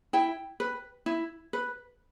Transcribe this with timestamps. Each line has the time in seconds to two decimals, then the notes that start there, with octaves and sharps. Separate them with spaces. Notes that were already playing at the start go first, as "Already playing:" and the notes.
0.13 E4 G5
0.60 B4
1.06 E4
1.53 B4